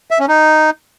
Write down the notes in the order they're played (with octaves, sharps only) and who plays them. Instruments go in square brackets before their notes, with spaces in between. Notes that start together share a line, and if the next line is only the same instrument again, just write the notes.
[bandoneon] E5
C#4
D#4